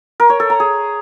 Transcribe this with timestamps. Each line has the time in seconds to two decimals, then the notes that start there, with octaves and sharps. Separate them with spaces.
0.20 A#4
0.30 C#5
0.40 A4
0.50 A#5
0.60 G#4